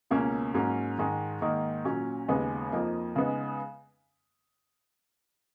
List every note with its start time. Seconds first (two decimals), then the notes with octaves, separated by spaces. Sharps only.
0.11 C#2 B2 A#3 C#4
0.54 G#2 F#3 A#3 C#4
0.98 G#2 D#3 G#3
1.41 G#2 D#3 A#3 D#4
1.85 A#2 F#3 C#4
2.28 D#2 C#3 G#3 B3 D#4
2.72 F2 F3 A#3 D#4
3.16 C#3 G#3 B3 D#4